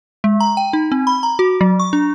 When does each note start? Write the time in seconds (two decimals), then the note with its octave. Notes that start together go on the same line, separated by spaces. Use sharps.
0.24 G#3
0.40 A#5
0.57 G5
0.73 D#4
0.92 C4
1.07 B5
1.23 A#5
1.39 F#4
1.61 F#3
1.80 C#6
1.93 D4